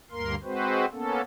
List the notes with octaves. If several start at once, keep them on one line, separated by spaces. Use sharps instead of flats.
D2 G2 A#3 A#4 C6
G#3 C4 F#4 B4 C5
A#3 B3 C#4 A4